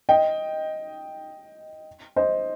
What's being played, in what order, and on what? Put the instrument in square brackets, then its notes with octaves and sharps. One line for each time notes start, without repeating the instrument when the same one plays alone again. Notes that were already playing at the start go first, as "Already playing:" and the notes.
[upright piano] D#5 G5
C5 D#5